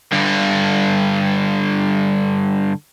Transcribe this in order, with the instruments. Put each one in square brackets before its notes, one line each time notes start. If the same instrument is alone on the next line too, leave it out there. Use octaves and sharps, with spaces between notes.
[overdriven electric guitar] G2 D3